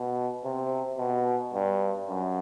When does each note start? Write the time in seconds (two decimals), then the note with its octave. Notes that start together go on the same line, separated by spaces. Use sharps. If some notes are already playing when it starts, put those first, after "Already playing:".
Already playing: B2
0.44 C3
0.98 B2
1.54 G2
2.08 F#2